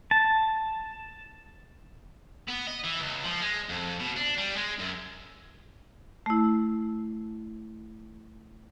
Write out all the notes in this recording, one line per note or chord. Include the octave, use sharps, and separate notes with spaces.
A5
B3
D#5
E3
C#2
F3
G#3
F2
B2
D4
G3
G#3
F#2
A3 E4